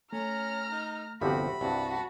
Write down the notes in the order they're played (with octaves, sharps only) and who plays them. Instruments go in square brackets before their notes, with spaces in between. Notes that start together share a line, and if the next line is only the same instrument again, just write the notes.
[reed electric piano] A3 [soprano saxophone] C#4 [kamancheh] A#5 F6
[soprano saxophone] D#4
[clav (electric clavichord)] G1 C2 F3 [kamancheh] F#4 [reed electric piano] G4 E5 [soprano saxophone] B5
[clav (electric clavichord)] C2 G2 [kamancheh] F#4 A5